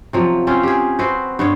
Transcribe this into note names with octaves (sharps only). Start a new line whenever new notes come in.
C3 F3 F#3
C4 C#4 F4 C5
G4 G#4
C4 F#4 B4 C5
G2 B3 C5 C#5